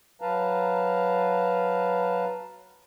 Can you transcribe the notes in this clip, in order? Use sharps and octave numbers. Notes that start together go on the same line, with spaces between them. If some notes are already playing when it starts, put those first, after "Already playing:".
F#3 B4 F5 A5 A#5